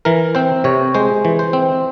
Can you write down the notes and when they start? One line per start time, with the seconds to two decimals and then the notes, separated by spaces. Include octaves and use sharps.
0.05 E3 A#4
0.35 C4 C5
0.64 C3 C#5
0.94 G#3 C5
1.25 E3
1.39 C5
1.53 C4